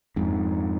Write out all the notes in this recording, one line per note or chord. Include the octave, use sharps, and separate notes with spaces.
F2 G#2